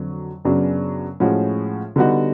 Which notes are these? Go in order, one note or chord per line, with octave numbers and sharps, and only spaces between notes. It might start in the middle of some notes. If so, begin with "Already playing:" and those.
Already playing: F2 D3 F#3
F#2 C#3 F#3 B3 D4
A2 F3 G#3 C#4 F#4
D3 G3 B3 D#4 F#4